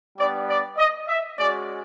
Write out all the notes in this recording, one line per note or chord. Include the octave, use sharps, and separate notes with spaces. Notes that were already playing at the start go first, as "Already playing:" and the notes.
G3 B3 D4 D5
D5
D#5
E5
G#3 C#4 F#4 D5